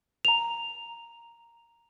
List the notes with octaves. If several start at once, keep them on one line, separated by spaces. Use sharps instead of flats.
A#5 F7